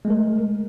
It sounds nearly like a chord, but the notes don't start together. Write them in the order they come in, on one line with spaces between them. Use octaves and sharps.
G#3 A3 A#4